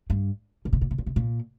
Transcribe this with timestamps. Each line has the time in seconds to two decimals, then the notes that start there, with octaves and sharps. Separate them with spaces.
0.10 G2
0.65 A#2
0.73 C3
0.81 A#2
0.91 C3
0.98 A#2
1.06 C3
1.16 A#2